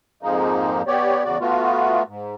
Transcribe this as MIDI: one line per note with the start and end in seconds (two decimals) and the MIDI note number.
0.23 0.82 41
0.23 0.82 44
0.23 0.82 53
0.23 0.82 56
0.23 0.82 58
0.23 0.82 63
0.87 1.23 59
0.87 1.23 67
0.87 1.23 73
0.87 1.23 74
1.24 1.38 40
1.24 1.38 49
1.24 1.38 66
1.24 1.38 74
1.40 2.03 57
1.40 2.03 59
1.40 2.03 65
1.40 2.03 66
2.07 2.35 44